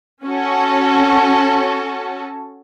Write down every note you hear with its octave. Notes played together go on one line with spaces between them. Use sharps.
C#4 F#4 A4